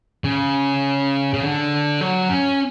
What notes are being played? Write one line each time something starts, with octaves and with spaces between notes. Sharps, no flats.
C#3
C#3
D3
F#3
C#4